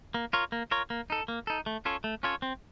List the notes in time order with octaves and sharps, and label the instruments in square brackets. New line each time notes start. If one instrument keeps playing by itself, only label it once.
[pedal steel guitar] A#3
F4 A#4 C#5
A#3
F4 A#4 C#5
A#3
D#4 A4
A#3
D#4 A4
A3
C#4 F4 A4 C#5
A3
C#4 F4 A4 C#5
C4